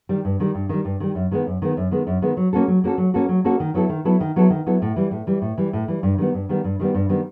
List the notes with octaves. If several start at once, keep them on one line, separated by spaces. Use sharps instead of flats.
D#3 G3
G2
D#3 G3
G2
D#3 G3
G2
D#3 G3
F#2
D#3 G#3 B3
F#2
D#3 G#3 B3
F#2
D#3 G#3 B3
F#2
D#3 G#3 B3
F#3
A#3 C#4 F#4 A4
F#3
A#3 C#4 F#4 A4
F#3
A#3 C#4 F#4 A4
F#3
A#3 C#4 F#4 A4
D#3
F#3 B3 E4 A4
D#3
F#3 B3 E4 A4
D#3
F#3 B3 E4 A4
D#3
F#3 B3 E4 A4
A2
E3 G3
A2
E3 G3
A2
E3 G3
A2
E3 G3
G2
D#3 G3 B3
G2
D#3 G3 B3
G2
D#3 G3 B3
G2
D#3 G3 B3